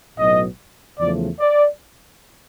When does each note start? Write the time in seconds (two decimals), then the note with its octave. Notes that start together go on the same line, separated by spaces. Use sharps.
0.17 B1 A2 F#3 B3 D#5
0.99 E2 C#3 F3 A3 D5
1.40 D5